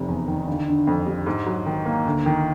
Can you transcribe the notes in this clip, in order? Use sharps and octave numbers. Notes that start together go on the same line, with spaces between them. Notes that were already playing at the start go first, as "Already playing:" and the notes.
Already playing: F1 C3
E2
D#3
G1
D3
F2
G3
G#2
F#3
D#3
A#3
D2
D#3